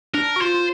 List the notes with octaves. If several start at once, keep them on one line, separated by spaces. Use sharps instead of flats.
D4 A#4
F#4
F4 C5
F4